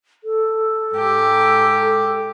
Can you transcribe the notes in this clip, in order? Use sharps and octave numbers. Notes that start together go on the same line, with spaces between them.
A4
G#2 G4